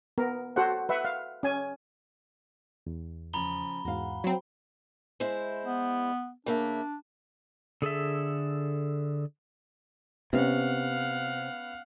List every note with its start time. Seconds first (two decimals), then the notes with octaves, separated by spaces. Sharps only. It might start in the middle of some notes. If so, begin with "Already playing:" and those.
0.18 B3 A#4
0.56 F#4 A4 C5 F#5
0.89 B4 E5 F#5
1.05 F5
1.43 C#4 G#5
2.87 E2
3.33 C#3 F3 A#5 B5 G7
3.85 E2 G#2 F#4 F5
4.24 F#3 C4
5.20 G#3 E4 C5
5.66 B3
6.46 C#3 A#3 D4 E5
7.82 D3 G#4 A4 E5
10.33 C3 B3 C#4 F5 F#5